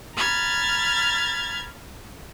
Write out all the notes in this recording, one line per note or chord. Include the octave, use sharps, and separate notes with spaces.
A#5 B5 F6 G#6 A6